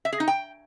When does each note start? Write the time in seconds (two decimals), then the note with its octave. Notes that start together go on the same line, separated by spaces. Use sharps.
0.05 E5
0.13 G#4
0.20 D#4
0.28 G5